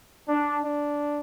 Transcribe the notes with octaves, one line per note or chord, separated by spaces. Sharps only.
D4
D4